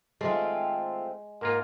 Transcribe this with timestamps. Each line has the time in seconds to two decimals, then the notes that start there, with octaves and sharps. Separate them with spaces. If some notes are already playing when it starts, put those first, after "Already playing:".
0.21 D#3 G#3 A3 C4 F4
1.41 G#2 A#3 F4 A#4